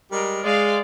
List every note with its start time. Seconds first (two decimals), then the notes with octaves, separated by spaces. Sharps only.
0.12 G3 G#3 A#4
0.44 G#3 D5 F5